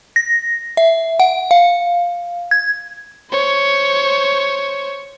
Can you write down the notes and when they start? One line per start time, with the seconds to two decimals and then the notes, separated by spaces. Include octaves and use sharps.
0.16 A#6
0.77 E5
1.20 F#5
1.51 F5
2.51 G#6
3.30 C5 C#5